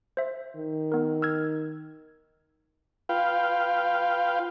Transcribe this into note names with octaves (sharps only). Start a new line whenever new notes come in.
C5 E5
D#3
B3 A#4
E6 F6 G#6
F4 B4 F5 G5